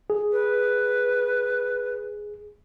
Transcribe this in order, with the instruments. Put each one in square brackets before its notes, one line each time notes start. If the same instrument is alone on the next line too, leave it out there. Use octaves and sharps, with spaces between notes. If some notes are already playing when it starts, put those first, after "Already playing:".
[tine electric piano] G#4
[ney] B4